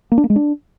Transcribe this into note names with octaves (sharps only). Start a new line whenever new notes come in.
A#3
D4
A#3
G#3
D4